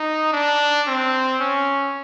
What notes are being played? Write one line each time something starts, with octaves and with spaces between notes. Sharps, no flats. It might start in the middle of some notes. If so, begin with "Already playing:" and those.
Already playing: D#4
D4
C4
C#4